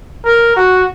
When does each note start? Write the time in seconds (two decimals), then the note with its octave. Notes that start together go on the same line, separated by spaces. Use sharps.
0.25 A#4
0.56 F#4